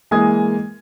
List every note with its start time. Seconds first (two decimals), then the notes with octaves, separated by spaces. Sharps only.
0.11 E3 G#3 A#3 G#5 D#6 G#6